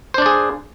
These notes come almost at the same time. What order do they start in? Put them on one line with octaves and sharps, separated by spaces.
C5 D4 D5 G#4